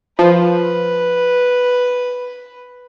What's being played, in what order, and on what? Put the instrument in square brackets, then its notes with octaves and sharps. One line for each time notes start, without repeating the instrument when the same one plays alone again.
[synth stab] F3 [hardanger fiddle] B4